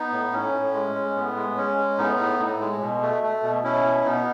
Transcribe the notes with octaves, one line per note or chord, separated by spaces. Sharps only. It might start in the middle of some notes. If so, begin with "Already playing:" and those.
Already playing: B3 D#4
A2
A2 C#4
A2
G#3
G#3
A2 B3
G#3
G#3 C#4
G#3
A2 B3 D#4
A2
A2
G#3
B2
A3
A3
B2
B2 C#4 E4
B2
B2 B3 D#4